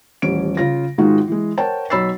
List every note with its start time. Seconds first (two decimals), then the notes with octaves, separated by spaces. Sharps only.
0.22 D#1 A1 C#4 D7
0.57 C#3 F4 A#6
0.98 G#2 D#3 G#3 D#4 F4 F#4
1.28 E3 G#3
1.58 A#4 C5 C#5 F#5 G5 A5
1.90 B1 C#5 B5 E6 A6 C7